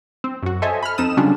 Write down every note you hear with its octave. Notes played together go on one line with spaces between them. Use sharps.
C4
F#2 F#4
A4 C5 C#5 D#5 E5 G#5
B5 F6
F2 C4 D#4 A4 D#6 E7
C#3 F#3 G3 C#4 D4 F4